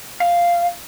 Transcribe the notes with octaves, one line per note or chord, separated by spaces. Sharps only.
F5